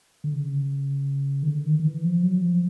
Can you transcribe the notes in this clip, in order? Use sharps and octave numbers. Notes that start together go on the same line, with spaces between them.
D3
C#3
D#3
D3
D#3
D#3
E3
F3
F#3
F3